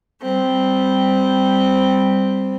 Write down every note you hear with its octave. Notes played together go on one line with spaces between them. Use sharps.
G3 C4